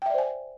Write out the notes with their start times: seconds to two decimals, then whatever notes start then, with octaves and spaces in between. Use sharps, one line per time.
0.02 G5
0.06 E5
0.10 D5
0.14 C5
0.18 G#5